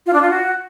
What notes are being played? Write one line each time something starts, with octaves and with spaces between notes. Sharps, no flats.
F4
D4
F4
F#4